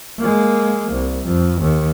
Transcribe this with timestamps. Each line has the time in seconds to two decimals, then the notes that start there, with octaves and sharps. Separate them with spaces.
0.19 G#3 A#3
0.92 C2
1.26 F2
1.62 D#2